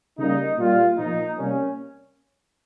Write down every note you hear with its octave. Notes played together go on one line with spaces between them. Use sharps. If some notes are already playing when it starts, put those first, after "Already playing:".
C#3 G3 A#3 D#4
A#2 G3 A#3 F4
A#2 F3 A#3 D#4
C3 G3 A#3 C#4